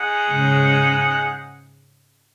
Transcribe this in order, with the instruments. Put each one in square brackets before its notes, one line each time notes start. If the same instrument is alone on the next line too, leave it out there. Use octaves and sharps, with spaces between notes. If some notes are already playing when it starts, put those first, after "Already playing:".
Already playing: [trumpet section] G#3 D#4 G#4 F#5
[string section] G#2 C#3